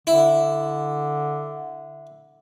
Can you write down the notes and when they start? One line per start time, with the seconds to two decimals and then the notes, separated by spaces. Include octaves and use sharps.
0.07 D3 E4